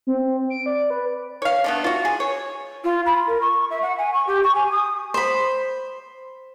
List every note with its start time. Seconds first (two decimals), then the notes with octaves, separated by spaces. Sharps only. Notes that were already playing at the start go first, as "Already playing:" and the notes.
0.07 C4
0.50 D7
0.66 D5
0.90 B4
1.42 C#5 F5
1.64 D3 A3 B3
1.84 F4 F#4
2.05 G#4
2.20 C#5
2.84 F4
3.06 B5
3.27 A#4
3.41 C#6
3.70 E5
3.82 F#5
3.98 G#5
4.14 C#6
4.27 G4
4.43 C#6
4.55 G#5
4.71 D#6
5.14 C5 B5